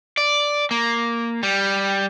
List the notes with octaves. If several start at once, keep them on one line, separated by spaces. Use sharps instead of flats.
D5
A#3
G3